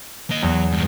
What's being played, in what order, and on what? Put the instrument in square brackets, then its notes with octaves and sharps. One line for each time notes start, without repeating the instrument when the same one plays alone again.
[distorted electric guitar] A#3 D#5
[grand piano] E2 [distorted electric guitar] F#3
[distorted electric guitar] G2 G#3